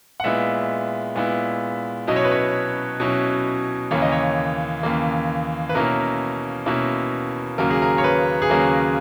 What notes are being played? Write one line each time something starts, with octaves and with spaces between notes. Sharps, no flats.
F#5
A#2 G#3 B3 E4 E5
A#2 G#3 B3 E4
B2 F#3 C#4 E4 D#5
C#5
B4
C#5
B2 F#3 C#4 E4
D#2 C#3 E3 A#3 C#5
D#5
C#5
D#2 C#3 E3 A#3
B4
B2 A#3 C#4 E4 A#4
B2 A#3 C#4 E4
D#2 C#3 F#3 A#3 C#4 A#4
G#4
A#4
C#5
B4
G#4
D#2 C#3 F#3 A#3 C#4 A#4